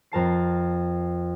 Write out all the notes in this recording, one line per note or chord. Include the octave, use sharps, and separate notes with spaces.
F2 A#4 A5 C7